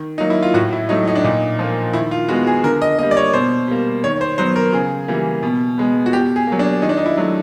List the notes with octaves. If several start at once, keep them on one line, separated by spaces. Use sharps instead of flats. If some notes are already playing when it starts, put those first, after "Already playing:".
Already playing: D#3
F#3 A#3 D#4
E4
F4
A2 F#4
E4
F#3 A3 D#4
D#4
D4
A#2 D#4
F3
A#3
D#3 E4
F4
G#3 B3 F#4
G#4
D3 A#4
D#5
G3 A#3 D#5
D5
C#5
B2 C5
G3 A#3
D#3 C#5
C5
F#3 B3 C5
A#4
C#3 G#4
E3 G3 A#3
B2
G#3 B3
F#4
B2 G4
G#4
F#3 A#3
D4
D#3 D#4
D4
D#4
E4
F#3 A3